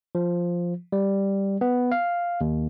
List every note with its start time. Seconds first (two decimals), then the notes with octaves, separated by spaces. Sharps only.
0.15 F3
0.92 G3
1.61 B3
1.92 F5
2.41 D#2